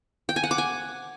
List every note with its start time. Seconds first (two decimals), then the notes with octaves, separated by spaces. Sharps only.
0.29 G5
0.36 G#5
0.43 F#5
0.51 D6
0.58 G#5